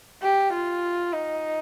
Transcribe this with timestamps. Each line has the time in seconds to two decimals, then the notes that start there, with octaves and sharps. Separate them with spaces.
0.22 G4
0.53 F4
1.13 D#4